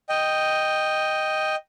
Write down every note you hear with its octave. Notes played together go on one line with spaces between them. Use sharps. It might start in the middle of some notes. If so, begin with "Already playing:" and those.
D#5 G5